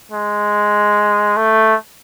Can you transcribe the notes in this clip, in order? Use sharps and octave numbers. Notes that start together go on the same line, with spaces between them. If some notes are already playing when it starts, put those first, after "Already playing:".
G#3
A3